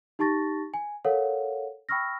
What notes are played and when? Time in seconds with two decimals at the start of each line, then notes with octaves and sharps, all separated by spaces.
0.19 D#4 G4 A5 C#6 A6 A#6
0.74 G#5
1.04 A4 A#4 C#5 F5 F#5
1.89 G5 B5 C#6 E6 F6 A#6